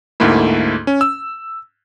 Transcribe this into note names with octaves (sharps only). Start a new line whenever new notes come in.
D2 G#2 A3 A#3 E4
C#4
E6